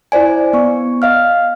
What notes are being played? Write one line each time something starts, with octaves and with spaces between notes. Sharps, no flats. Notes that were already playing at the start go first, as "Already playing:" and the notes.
E4 C5 D5 G#5
B3 C#6
D#5 F5 F6